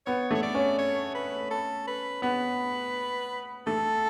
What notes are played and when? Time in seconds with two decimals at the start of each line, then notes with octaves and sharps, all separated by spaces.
0.06 B3 C#5
0.31 A3 C#5
0.43 D5
0.55 C#4
0.78 C#5
1.15 B4
1.51 A4
1.87 B4
2.22 B3 B4
3.67 A3 A4